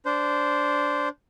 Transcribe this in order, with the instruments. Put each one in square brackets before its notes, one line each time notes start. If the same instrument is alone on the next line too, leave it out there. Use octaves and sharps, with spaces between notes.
[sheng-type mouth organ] D4 C5